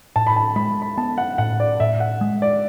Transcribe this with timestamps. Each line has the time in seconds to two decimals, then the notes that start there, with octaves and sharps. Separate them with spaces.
0.16 A2 A5
0.27 B5
0.36 A5
0.56 G#3 B5
0.82 B5
0.97 B3 A5
1.18 F#5
1.38 A2 F#5
1.60 D5
1.80 A2 E5
2.00 F#5
2.21 G#3
2.42 D5